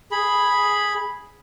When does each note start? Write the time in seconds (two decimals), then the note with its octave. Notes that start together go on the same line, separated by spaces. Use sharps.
0.11 G#4 B5